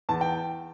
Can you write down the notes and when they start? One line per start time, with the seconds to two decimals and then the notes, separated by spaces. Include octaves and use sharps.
0.09 E2 A5
0.21 G5